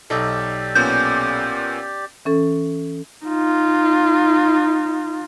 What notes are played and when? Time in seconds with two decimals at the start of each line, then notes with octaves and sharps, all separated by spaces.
0.10 B1 D#4 G4 A4 D5
0.75 A#2 B3 C#4 G6
2.25 E3 C#4 A4
3.25 D#4 F4